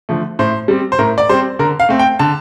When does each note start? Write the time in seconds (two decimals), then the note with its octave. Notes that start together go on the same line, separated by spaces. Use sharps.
0.09 D3 F3 A3
0.39 A2 C5
0.68 G3 C4
0.92 C5
0.99 A2 A#4
1.18 D5
1.29 G3 C4 C5
1.59 D3 A#4
1.80 F5
1.89 A3 C4
1.99 G5
2.19 D3 A5